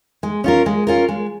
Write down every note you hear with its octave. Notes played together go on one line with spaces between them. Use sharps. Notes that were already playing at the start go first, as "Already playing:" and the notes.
G#3
C#4 F4 A#4
G#3
C#4 F4 A#4
G#3